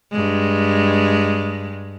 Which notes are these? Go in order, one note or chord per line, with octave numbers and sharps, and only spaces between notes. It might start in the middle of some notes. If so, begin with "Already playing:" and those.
G2 G#3